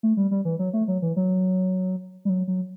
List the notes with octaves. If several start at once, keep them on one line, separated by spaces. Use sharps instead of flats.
A3
G3
G3
E3
F#3
A3
F#3
E3
F#3
G3
F#3
F#3